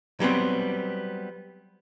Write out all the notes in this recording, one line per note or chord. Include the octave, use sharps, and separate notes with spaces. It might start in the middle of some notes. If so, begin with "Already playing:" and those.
F#3 G3 B3 C4